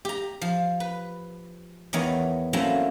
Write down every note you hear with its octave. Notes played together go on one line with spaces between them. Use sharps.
G4 A#5
F3
B4
E2 D#3 B3 C#5 A#5
F#3 A3 A#3 C4 C#4 E4